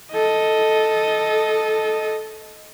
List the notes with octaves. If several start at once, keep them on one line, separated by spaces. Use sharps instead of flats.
A4 D#5